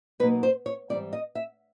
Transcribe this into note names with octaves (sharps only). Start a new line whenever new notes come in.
B2 F#3 A#3 D#4 B4
C5
C#5
G#2 E3 G3 C4 D5
D#5
E5